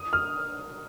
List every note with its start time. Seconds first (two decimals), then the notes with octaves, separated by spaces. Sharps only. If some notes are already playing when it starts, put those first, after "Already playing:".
Already playing: D#6
0.13 F6